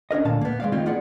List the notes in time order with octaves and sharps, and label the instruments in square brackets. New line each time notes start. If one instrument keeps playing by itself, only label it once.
[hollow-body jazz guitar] C#4 D4 A#4 D#5
D2 A#2 D3 F5 A5
A#3 B3
G#3 A#3 D5 F5
D#3 E3 A3 C4 D#4 F4
A#3 B3 F4 G#4 D5 F#5